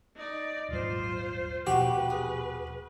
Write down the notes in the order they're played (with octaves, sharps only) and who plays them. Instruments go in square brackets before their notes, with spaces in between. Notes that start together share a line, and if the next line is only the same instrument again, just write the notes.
[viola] D#4 D5
[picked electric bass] D#1 G#1 F#3 [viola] F4 C5
[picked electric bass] D#1 B2 F3 [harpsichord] F#4 [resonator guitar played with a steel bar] G4 [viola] B4
[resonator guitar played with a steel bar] G#4